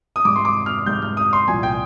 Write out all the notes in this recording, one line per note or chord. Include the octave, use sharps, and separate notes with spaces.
D#6
G#2 G3 D6
C6
D6
F6
G#2 G3 G6
F6
D#6
C6
C2 A#2 F3 G#5
G5